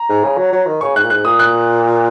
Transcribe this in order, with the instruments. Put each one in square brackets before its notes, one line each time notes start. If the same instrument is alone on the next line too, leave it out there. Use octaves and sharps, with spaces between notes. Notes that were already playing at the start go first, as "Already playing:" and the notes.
Already playing: [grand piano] A#5
[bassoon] G#2
C#3
F#3
F#3
D#3
[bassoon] C#3 [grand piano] C#6
[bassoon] G#2 [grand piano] F#6
[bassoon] A#2
[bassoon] G#2 [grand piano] F#6
[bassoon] A#2 [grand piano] D#6
[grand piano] F#6